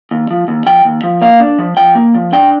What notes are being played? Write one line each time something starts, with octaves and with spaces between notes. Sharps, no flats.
D#2
F3
D#2
F3 G5
D#2
F3
A#3 F5
D4
F3
F3 G5
A#3
F3
D4 G5